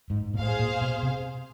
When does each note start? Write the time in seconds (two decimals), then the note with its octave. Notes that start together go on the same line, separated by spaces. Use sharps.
0.10 G#2
0.34 A#2
0.38 A2 G#4 C5 F5
0.59 A#2
0.81 B2
1.03 C3